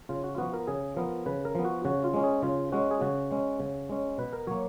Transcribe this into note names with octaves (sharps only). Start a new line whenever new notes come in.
C#3 F4
F#4
F4
F3 B3 F#4
A#4
C#3 G#4
F3 B3 A#4
C#3 B4
A#4
F3 B3
F#4
C#3 F#4
F4
G#3 C#4
G#4
C#3 F4
G#3 C#4 F#4
G#4
C#3 F#4
G#3 C#4
C#3
G#3 C#4
B2 B4
A#4
F#3 A#3 C#5